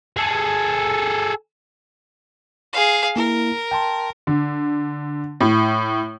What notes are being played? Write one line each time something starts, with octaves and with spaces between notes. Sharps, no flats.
G#4 A4
G#4 F5
A#3 E4 A#4
G5 A5 C6
D3
A2